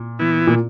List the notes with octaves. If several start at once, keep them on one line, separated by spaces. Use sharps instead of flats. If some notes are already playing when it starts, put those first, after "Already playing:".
Already playing: A#2
E3 B3 E4
A#2